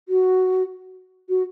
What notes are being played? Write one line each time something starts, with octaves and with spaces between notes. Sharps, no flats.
F#4
F#4